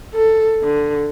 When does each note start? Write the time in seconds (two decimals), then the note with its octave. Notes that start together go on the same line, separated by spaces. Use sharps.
0.14 A4
0.63 D3